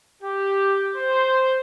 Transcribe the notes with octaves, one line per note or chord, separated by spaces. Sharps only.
G4
C5